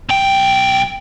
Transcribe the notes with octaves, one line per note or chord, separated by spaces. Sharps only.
B1 G5